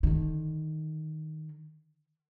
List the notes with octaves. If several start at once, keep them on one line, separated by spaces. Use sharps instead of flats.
D3 D#3